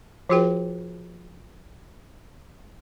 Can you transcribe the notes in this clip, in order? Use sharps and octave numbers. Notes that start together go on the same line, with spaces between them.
F3 F4 F#4 G#4 B4 G5